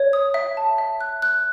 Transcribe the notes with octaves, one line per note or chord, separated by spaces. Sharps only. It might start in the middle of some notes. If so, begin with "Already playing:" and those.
Already playing: C#5
D#6
E5
A5
E5
F#6
F#6